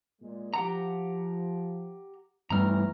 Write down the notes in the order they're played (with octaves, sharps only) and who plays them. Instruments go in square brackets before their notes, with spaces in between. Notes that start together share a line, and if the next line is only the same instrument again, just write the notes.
[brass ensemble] A#2 G#3
[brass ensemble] F3 [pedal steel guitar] G4 F#5 A#5
[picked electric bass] G2 G3 A3 [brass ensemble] E3 B3 C#4 [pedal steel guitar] A#5 F6